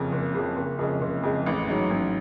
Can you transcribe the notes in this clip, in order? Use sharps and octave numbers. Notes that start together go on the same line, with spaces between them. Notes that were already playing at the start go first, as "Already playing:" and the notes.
Already playing: F#1 F2 C#3
F#1
F2 C#3
F#1
F2 C#3 G#3
F#1
F2 C#3 G#3
A1
G#2 F#3
A1